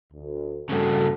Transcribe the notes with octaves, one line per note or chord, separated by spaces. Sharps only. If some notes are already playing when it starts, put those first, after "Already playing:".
D2
G2 C#3 F#4 A4